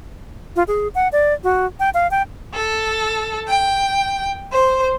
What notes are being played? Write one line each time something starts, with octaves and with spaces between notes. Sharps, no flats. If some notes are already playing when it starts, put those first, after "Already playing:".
F4
G#4
F#5
D5
F#4
G5
F5
G5
A4
G5
C5